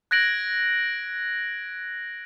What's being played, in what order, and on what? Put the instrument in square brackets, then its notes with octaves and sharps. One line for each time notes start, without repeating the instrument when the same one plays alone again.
[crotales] F#6 G#6 A#6 D7 F#7